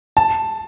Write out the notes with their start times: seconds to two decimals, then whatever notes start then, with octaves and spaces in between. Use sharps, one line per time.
0.17 A5